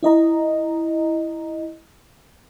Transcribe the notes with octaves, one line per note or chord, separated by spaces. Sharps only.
E4 D#5 A#5